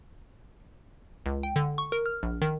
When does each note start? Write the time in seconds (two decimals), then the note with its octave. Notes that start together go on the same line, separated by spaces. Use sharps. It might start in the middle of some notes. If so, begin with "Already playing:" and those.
1.26 C#2
1.43 G5
1.56 D3
1.78 C#6
1.92 A#4
2.06 F6
2.23 A#1
2.42 D#3